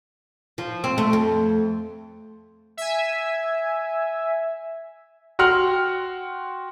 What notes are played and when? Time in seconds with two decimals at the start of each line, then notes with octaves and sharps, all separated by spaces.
0.58 F3
0.84 C4
0.98 A3
1.13 F2
2.77 E5 G#5
5.39 F#4 F#5 G5 C6 F6